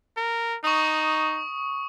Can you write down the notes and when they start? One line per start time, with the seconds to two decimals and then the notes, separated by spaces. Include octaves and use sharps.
0.17 A#4
0.64 D#4 C#6 D#6